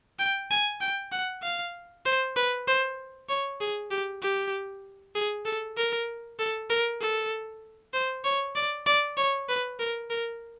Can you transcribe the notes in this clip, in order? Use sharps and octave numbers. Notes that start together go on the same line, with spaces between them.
G5
G#5
G5
F#5
F5
C5
B4
C5
C#5
G#4
G4
G4
G#4
A4
A#4
A4
A#4
A4
C5
C#5
D5
D5
C#5
B4
A#4
A#4